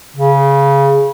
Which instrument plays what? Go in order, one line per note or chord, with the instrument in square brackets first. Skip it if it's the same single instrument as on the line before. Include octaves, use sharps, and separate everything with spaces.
[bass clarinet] C#3